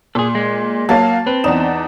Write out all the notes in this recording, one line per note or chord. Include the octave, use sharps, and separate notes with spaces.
A#2 G#4 A4
G#3
F#3 A#3 F5 A5
C4 B4
E2 D#4 D5 E7